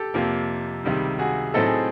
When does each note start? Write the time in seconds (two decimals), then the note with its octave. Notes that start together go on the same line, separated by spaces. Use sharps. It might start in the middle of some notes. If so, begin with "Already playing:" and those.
Already playing: G4 A4
0.14 F2 C3 F3 A#3
0.84 C#2 C3 D#3 G3
1.19 F#4 G#4
1.54 A2 F#3 A3 C4 D#4 A4
1.66 G#4